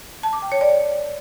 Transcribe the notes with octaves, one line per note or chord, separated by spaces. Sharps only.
A5
D6
G5
C#5
D5